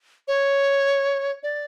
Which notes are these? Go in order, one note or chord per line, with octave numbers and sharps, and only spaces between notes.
C#5
D5